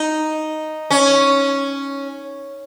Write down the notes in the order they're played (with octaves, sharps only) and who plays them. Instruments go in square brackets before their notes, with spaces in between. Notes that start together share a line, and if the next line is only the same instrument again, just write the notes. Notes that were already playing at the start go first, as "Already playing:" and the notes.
Already playing: [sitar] D#4
C#4